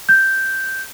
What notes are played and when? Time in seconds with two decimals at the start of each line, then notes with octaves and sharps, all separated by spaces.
0.09 G6